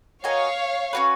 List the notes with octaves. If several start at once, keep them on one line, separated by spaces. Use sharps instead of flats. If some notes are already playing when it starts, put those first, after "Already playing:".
F#4 A#4 C#5 D#5 F5 G#5
C#4 F#4 B4